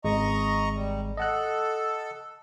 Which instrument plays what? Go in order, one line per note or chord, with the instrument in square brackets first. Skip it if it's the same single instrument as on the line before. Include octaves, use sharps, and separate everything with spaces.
[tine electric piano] G#1 G#3 [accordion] D#5 A#5 C#6
[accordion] G3
[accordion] A4 [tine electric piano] D#5 F#5 F#6